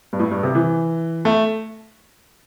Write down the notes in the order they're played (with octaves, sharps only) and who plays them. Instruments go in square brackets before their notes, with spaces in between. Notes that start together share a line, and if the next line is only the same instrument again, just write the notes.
[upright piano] G2
A2
G2
C3
E3
A3